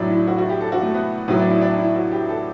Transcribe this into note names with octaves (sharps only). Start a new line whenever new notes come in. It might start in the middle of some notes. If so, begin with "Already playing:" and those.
Already playing: A2 F#3 D4
E4
F#4
F#4
G4
A4
F#4
A3
B3
A2 F#3 B3
D4
E4
D4
E4
F#4
G4
A4